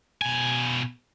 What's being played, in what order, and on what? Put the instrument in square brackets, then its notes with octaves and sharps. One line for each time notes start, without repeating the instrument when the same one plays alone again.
[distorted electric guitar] B2 G#5